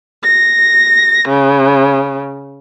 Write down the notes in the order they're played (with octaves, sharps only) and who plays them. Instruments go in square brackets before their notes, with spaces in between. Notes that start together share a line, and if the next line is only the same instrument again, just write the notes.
[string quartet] A#6
C#3